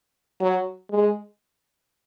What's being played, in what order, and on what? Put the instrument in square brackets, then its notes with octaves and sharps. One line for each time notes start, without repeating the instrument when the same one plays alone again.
[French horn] F#3
G#3